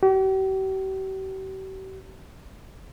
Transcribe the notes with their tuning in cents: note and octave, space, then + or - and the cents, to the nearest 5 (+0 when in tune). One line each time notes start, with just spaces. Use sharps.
G4 -45